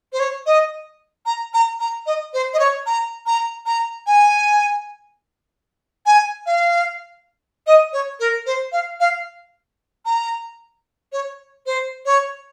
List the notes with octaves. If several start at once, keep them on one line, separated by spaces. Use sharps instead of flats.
C5
C#5
D#5
A#5
A#5
A#5
D#5
C5
D#5
C#5
A#5
A#5
A#5
G#5
G#5
F5
D#5
C#5
A#4
C5
F5
F5
A#5
C#5
C5
C#5